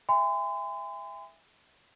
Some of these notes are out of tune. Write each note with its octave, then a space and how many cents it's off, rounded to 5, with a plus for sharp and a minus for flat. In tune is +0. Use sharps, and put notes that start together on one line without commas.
E5 -5 G#5 -40 C6 -40